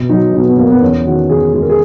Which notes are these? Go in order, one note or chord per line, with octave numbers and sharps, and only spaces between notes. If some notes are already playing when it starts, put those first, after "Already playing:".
Already playing: B2
F#3 D#4
B2 D#4
B3
A#3
B3
E2 C#4
D#3 F#4
E2 G#4
G#3 G#4
A#4
G#4